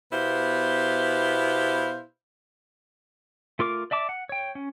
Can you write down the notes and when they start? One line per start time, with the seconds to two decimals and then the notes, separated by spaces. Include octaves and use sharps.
0.12 B2 B3 E4 G4 C5 F5
3.59 A3 F4 A#4 D6
3.91 D5 E5 A5 D6
4.09 F#5
4.29 C#5 G5
4.55 C#4